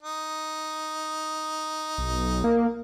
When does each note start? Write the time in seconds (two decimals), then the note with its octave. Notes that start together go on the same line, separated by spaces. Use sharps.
0.03 D#4
1.98 B1
2.44 A#3